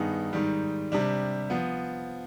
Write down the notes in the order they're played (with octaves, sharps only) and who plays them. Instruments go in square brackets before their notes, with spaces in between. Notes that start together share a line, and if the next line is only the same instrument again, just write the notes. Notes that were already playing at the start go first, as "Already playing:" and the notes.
Already playing: [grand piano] G2 D#3 B3 D#4 G#4
G#2 D#3 G3
C3 G3 D4
F3 B3